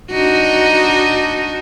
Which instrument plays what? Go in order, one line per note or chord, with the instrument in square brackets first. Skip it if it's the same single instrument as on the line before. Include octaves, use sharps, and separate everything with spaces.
[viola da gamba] D4 D#4 F#4